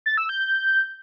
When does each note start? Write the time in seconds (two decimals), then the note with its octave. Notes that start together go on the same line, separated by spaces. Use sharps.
0.06 A6
0.17 E6
0.29 G6